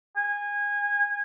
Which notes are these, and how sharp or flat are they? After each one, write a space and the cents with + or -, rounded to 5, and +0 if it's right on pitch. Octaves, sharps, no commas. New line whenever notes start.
G#5 -20